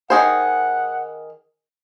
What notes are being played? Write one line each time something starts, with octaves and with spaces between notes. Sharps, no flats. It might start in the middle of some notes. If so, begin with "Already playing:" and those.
D#3 G#4 C5 F#5